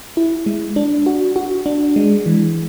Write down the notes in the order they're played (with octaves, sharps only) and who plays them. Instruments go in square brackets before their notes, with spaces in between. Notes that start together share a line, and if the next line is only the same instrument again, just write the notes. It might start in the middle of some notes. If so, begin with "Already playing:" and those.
[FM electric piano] E4
G#3
D4
F#4
F#4
D4
G#3
E3